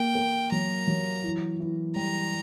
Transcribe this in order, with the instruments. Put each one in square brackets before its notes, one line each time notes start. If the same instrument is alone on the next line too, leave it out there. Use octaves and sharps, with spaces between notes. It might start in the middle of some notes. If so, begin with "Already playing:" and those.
Already playing: [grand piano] A#3 [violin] G5
[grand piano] A#3
[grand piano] F#3 [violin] A#5
[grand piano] F#3
E3
E3
[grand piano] G3 [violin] A#5